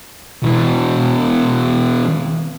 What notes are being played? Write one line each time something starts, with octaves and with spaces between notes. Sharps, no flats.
B2 E3